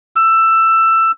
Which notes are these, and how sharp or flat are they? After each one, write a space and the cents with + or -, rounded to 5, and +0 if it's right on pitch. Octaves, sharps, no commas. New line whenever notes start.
E6 +15